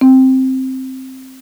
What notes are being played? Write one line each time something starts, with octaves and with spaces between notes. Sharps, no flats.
C4